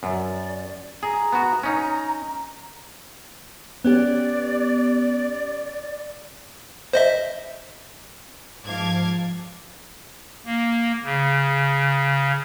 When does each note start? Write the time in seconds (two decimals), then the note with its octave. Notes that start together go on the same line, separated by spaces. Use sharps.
0.03 F#2 D5
1.03 G#4 A#5
1.33 B3 F#4
1.63 C#4 D#4
3.85 B3 C#4 G4 D5
6.93 C5 D#5 E5
8.64 G#2 F3 F5 A5 D6 G#6
10.45 A#3
11.04 C#3